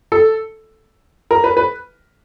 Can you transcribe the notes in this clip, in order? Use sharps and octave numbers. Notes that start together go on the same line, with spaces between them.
A4
A#4
B4
B4